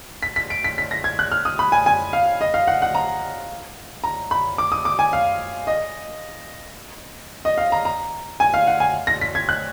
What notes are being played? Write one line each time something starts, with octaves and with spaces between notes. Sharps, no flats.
B6
B6
D7
B6
B6
A#6
G#6
F#6
F6
D#6
B5
G#5
G#5
F5
D#5
F5
F#5
F#5
A#5
A#5
B5
D6
D#6
D6
G#5
F5
D#5
D#5
F5
A#5
A#5
G#5
F5
F#5
G#5
A#6
B6
G#6
F#6